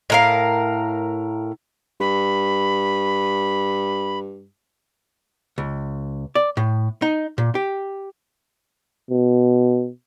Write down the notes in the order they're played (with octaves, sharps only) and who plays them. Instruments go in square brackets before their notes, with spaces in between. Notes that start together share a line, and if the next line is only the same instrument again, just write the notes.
[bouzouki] A2 A#4 F5
[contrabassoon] G2 [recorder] B5
[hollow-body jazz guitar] C#2
D5
A2
D#4
A#2
G4
[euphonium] B2